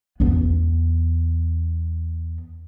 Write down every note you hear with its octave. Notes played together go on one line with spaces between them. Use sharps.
E2 B3